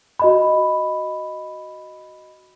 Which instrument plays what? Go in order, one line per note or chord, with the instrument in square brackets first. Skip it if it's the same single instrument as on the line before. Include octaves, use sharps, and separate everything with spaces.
[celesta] F#4 D#5 B5